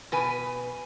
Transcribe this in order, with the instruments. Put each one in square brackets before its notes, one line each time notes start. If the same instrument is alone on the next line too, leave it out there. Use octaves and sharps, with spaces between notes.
[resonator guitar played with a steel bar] B2 B4 G#5